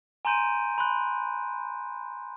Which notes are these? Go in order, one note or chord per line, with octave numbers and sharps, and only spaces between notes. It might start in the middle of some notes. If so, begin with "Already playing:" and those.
G#5 A#5 C6 G6 D7 D#7
B5 C6 F#6